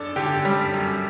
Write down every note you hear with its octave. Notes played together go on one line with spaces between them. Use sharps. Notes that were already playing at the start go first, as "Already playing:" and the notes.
Already playing: F#2 D4 A4 A5
D3 G4 G5
G3
F#2